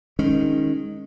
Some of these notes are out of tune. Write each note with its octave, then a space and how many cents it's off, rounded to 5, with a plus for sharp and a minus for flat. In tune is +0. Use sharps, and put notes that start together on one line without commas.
D#3 +0 G#3 +0 C#4 -10